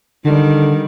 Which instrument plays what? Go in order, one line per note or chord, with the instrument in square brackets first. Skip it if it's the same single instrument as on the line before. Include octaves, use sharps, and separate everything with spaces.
[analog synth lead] D3 [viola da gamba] D#3 G3